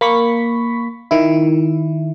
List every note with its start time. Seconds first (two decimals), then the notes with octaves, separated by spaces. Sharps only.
0.01 A#3 B5 C#6 B6
1.11 D#3 E4